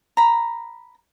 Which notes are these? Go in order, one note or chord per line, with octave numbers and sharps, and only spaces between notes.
A#5 B5